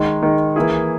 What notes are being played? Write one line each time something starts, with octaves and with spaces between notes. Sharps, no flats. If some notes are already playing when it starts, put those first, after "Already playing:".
Already playing: D#3 G#3 D#4
D#3 G#3 D#4
E3 A#3 E4 G#4